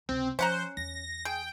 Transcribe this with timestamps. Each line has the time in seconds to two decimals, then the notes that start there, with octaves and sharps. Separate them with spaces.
0.09 C#2 C3 C4
0.39 F3 C#4 C5 F#5 A#5
0.77 E2 A#6
1.25 G#4 G5